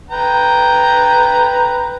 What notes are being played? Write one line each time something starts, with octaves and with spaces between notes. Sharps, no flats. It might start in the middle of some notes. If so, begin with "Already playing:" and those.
B4 G5 A#5